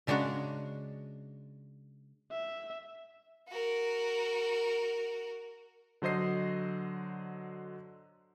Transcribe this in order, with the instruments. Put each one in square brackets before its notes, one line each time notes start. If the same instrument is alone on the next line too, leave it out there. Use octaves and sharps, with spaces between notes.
[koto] C#3 G#3 D4 F#4 A#5
[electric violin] E5
[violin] F#4 A#4
[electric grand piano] D3 F#3 C5 D#5 C7